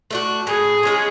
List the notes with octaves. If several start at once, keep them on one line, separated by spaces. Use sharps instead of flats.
A3 D4 F#4
A2 G#4
G#3 C#4 F4